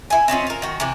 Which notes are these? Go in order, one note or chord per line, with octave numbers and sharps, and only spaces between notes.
E4 G#5
C4 C#4 D#4 F4
F4 A#4
D#3 F#4
C3 E3